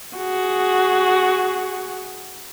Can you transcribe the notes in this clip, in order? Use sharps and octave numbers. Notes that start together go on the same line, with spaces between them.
F#4 G#4